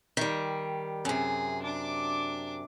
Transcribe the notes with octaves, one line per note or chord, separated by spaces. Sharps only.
D#3 G3
F#2 C3 G#4
D4 D6